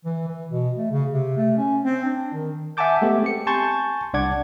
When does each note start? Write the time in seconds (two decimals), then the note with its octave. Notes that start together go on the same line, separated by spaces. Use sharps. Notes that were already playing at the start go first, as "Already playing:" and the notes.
0.05 E3
0.28 E3
0.51 B2
0.76 A3
0.91 C#3
1.11 C3
1.37 A3
1.57 C#4
1.83 C4
2.04 D4
2.33 D#3
2.77 E5 F#5 G#5 A5 D6 G6
3.02 G#3 A3 B3 G4
3.22 C4 G4 C#7
3.47 G#5 A5 C6 C#6 G6 A6
4.14 C2 D4 D5 F#5 D6 G#6